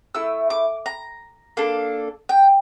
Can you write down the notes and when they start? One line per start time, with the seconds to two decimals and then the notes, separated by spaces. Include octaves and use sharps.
0.15 A3 E4 E6
0.50 D6
0.86 A#5
1.57 A#3 D4 A4
2.29 G5